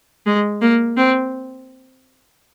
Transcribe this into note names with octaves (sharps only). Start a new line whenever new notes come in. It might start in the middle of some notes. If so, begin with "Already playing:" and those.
G#3
A#3
C4